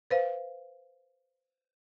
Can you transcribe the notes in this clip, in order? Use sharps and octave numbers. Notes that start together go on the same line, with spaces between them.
B4 C5 F5